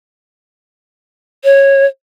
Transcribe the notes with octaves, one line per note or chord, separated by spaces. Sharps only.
C#5